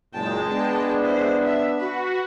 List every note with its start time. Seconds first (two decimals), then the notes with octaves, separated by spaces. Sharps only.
0.14 F#1 A#2 G#3 G5 A5
0.49 B3 D4
1.00 E4 C5
1.44 E5
1.80 F#4 B4